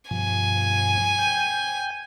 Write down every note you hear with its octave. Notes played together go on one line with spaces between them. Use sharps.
G2 B2 F3 G#5
G5 G6